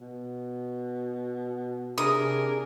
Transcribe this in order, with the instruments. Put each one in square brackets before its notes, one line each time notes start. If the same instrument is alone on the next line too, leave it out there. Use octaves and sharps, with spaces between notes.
[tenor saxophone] B2
[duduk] C3 [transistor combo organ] D4 G#4 [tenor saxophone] A#4 [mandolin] D#6